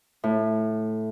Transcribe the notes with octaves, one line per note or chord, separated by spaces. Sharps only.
A2